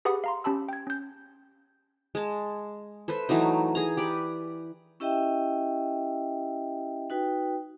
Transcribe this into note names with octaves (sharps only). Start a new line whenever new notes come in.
G4 G#4 B4 F#5 B5 D#6
F5 A#5 C6
C#4 G4 A5 B5 E6
G5 G#6
C#4 G6
G#3 A5
A4 B4 C5 E5
E3 F#3 A3 D#4
G#4 A#5
G4 B4 D5
C#4 E4 G4 D#5 E5 G5
D#4 F#4 B4 G5